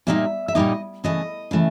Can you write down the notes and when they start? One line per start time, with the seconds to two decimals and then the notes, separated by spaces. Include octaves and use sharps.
0.07 A#2 G3 A#3 D#4 E5
0.48 E5
0.55 A#2 G3 A#3 D#4 D#5
1.04 C#3 E3 A3 D#5
1.51 C#3 E3 A3